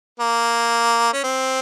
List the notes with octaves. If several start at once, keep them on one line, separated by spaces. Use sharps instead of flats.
A#3
C#4
C4